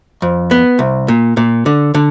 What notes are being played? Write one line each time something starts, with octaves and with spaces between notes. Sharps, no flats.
F2
B3
C2
A#2
A#2
D3
D3